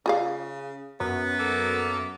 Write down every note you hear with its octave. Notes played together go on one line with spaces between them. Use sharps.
C#3 F4 G#4 F5
F#2 B3
A#3 A4